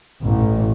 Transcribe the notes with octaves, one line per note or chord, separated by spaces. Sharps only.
A1